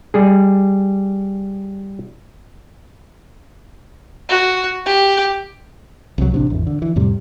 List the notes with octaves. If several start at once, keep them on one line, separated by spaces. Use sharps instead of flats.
G3 G#4
F#4
G4
C2 C3 F3 F#3
A1 C3 D4
G#1 E2
D3
E3
F2 A2 C3 G3